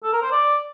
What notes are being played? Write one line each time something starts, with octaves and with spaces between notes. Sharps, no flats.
A4
A#4
C5
D5